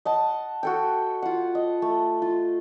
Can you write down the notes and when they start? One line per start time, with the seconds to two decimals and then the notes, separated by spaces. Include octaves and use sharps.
0.05 D#5 F#5 A5
0.63 F#4 A4 G5
1.22 F4 F#5
1.55 D#5
1.82 A3
2.22 F4